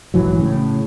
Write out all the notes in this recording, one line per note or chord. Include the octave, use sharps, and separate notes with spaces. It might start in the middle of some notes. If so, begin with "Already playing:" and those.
A#1 G#2 E3 F#3
A2 C#3